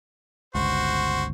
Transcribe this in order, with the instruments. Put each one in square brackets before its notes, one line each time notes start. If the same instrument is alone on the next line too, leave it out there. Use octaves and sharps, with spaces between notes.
[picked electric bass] G1 C#2 [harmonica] F#4 C5